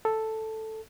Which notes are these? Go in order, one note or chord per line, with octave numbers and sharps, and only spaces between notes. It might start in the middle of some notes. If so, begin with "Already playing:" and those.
A4